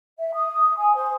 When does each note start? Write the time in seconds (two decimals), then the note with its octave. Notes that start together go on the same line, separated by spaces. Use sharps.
0.19 E5
0.34 D#6
0.77 G#5
0.95 C5